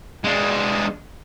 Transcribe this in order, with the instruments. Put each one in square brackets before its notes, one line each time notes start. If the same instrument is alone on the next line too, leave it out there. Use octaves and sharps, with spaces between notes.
[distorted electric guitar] G#3 D4